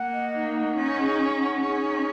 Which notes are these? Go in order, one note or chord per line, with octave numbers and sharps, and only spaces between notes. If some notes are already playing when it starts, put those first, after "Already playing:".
Already playing: A#3 F#5
D#5
D#4
F#5
C#4 D#4
G#4
D#4
F#5
C#4 G#4
D#4